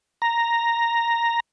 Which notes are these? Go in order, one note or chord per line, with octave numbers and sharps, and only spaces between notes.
A#5